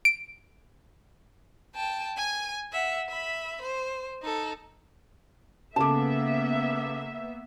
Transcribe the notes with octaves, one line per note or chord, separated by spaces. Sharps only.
D7
G5 A5
G#5 D#7
E5 F#5
E5 B5
C5
D#4 A4
C#3 A#3 B3 A4 E5 A5 D6